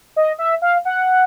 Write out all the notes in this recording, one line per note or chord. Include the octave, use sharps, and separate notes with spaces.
D#5
E5
F5
F#5